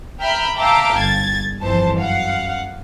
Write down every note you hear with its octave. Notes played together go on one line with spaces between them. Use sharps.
E5 G5 A#5 B5 F6
E5 F5 G5 A5 A#5 D6
G1 G#6 A6
G1 F2 E3 C5 A5
F#2 F5 F#5